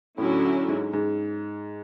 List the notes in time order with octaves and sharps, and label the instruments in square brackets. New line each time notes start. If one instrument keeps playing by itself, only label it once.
[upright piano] A2 [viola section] D3 F#3 C#4 E4
[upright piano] G#2
G#2